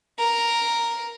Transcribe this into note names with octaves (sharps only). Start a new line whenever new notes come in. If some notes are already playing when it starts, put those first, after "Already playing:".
A#4